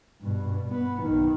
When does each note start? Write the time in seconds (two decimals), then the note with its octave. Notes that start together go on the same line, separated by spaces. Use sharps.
0.21 G2 B2
0.69 B3
1.03 B1 D#3